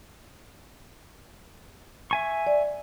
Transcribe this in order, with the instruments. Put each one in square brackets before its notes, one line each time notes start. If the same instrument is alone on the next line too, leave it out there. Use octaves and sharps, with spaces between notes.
[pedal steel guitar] E5 G#5 C#6
[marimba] D5